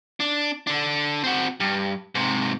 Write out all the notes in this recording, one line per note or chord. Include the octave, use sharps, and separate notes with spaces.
D4
D3 D4
C4 F#4
G2
G#2 C3